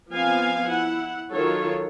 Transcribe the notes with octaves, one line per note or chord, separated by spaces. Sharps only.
F3 B3 C4 F5 G#5
E4 F#5
D#3 F#3 F4 A4 C#5